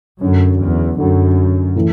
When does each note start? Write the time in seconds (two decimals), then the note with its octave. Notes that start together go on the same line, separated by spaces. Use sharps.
0.21 F#2 D3 F#3 C#4
0.60 E2
0.98 F#2 D3 F#3 C#4
1.75 A2 E3